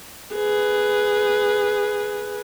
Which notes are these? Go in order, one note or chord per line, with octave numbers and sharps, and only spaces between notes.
G#4 B4